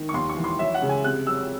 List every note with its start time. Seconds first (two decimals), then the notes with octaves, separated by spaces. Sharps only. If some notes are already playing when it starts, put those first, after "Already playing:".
Already playing: D#3
0.09 C#6
0.14 D#2 C6
0.29 C#6
0.37 E3
0.44 C6
0.59 F#3 E5
0.74 F#5
0.82 C#3
0.89 G#5
1.04 C3 F#6
1.27 F#3 E6